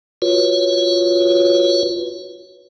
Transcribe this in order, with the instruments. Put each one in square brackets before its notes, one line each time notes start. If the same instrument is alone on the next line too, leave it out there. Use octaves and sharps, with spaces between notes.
[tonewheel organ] F4 F#4 B4 C#5